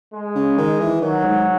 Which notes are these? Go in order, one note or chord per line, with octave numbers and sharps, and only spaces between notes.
G#3
C#3
D#3
E3
D#3 F#3
G#2